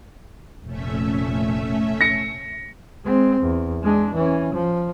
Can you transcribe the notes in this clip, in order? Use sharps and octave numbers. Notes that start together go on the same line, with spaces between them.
F1 A#2 A3 C#4 E5
A#6 C#7
G#3 C4
E2
G#3 D4
E3 C#4
F3